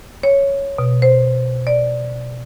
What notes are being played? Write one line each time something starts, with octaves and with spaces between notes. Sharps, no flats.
C#5
B2
C5
D5